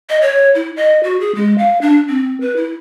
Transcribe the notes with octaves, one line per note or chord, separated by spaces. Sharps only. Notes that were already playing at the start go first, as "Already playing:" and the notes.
D#5
C#5
E4
D#5
F#4
G#4
G#3
F5
D4
C4
B4
E4